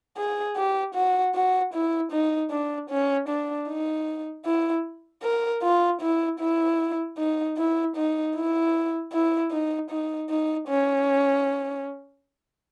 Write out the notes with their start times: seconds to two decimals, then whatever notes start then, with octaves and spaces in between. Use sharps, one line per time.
0.17 G#4
0.56 G4
0.95 F#4
1.34 F#4
1.73 E4
2.12 D#4
2.51 D4
2.90 C#4
3.28 D4
3.68 D#4
4.45 E4
5.23 A#4
5.62 F4
6.01 E4
6.39 E4
7.18 D#4
7.57 E4
7.96 D#4
8.35 E4
9.12 E4
9.51 D#4
9.90 D#4
10.30 D#4
10.68 C#4